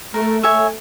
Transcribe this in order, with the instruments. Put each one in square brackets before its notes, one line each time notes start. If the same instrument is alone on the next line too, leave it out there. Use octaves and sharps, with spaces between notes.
[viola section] A3 [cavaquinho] A#4
[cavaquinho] C#5 E5 G#5